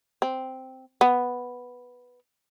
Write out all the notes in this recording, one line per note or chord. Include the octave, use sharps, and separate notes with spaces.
C4
B3